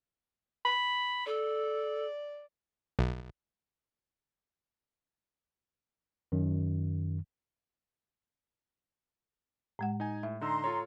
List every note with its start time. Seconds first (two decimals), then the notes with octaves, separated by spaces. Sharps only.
0.65 B5
1.26 A4 D5
2.99 B1
6.32 F#2 D#3
9.79 A2 G#3 F#5
10.00 D#4 G#5
10.23 A2 E5
10.41 D3 D#4 A#5 C6 E6
10.64 F4 A4 C#5